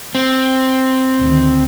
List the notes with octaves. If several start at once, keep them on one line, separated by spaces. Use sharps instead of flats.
C4
D2 D#3